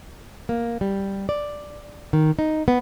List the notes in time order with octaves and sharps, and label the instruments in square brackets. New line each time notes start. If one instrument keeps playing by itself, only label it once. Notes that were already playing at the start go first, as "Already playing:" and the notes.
[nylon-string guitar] A#3
G3
D5
D#3
D#4
B3